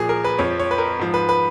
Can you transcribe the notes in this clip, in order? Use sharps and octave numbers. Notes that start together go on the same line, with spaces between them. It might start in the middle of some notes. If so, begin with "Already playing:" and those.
Already playing: A#2 F3 G#4
A#4
B4
F2 F3 C#5
C#5
B4
A#4
G#2 F3
B4
B4